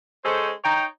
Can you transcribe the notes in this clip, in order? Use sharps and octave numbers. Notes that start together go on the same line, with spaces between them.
G#3 C#4 A4 C5
D#4 C#5 G5 A#5